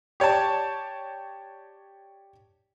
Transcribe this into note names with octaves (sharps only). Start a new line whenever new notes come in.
G4 C#5 D5 A5